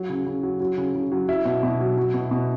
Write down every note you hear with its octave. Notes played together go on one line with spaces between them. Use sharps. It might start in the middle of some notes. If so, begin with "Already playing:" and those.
Already playing: F#3
C#3
C#3
F#3
F#3
C#3
C#3
F#3
F#3 E4
B2
B2
F#3
F#3
B2
B2